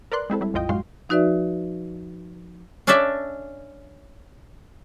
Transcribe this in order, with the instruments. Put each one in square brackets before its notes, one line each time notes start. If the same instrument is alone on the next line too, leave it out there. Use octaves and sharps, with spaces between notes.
[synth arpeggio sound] A#4 B4 D5 C6 F#6
G#3 C4 E4 A4
G3 E4
A#1 F2 F4 D#5 G5
F#2 A2 G#3 F#4 F5 C6
[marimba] F3 D#4 F#4 B4 D5 E5
[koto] C#4 D4 A4 D5 E5 A5